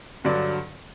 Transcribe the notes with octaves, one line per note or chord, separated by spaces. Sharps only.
G2 D3 F#3 D5